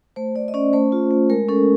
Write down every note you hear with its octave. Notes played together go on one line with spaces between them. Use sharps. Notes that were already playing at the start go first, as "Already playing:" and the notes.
A3 C5
A3 D5
D#5
C#4 D5
A3 C5
F4
A3
G#3 A#4
C#4 A4